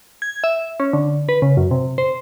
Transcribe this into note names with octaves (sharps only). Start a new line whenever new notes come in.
G#6
E5
C#4
D3
B4
C#3
F#2
C3
C5